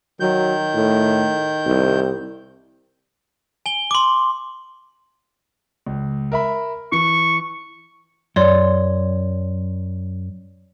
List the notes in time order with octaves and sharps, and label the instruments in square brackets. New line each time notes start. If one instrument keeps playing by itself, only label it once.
[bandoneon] D#3 G6 [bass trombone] F#3
[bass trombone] A2
C2
[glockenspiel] G#5 G7
C6 D6
[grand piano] C#2
A#4 E5 B5
[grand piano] E3 [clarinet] C#6
[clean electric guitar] F#2 [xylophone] C#5 D5 C6